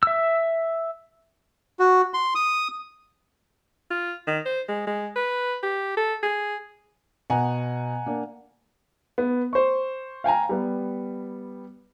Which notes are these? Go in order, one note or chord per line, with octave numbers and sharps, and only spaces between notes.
E5 E6
F#4
C6
D#6
F4
D#3
C5
G#3
G#3
B4
G4
A4
G#4
B2 F#5 G#5 A#5
A#3 D4
B3
C5 C#6
F5 G5 G#5 A#5
G3 B3